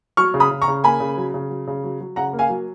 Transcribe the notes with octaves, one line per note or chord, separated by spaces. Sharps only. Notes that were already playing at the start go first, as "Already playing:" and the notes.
F#3 C#6 F6
C#3
B5 D#6
C#3
A#5 C#6
C#3
A#3 G#5 B5
C#3
F#3
C#3
F#3
C#3
F#3
F#3
C#3 F#5 A#5
A#3
F5 G#5
F#3